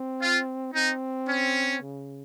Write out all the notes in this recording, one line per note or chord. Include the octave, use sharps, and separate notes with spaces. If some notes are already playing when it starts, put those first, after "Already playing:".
Already playing: C4
F4
C4 D#4
C#4
C#3